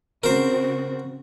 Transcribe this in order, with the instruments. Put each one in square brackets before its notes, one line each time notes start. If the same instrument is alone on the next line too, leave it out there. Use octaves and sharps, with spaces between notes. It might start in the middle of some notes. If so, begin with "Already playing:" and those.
[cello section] C#3 C4 F#4 [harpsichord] A#4 C5